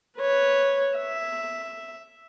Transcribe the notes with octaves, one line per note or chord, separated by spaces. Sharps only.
B4 C#5
E5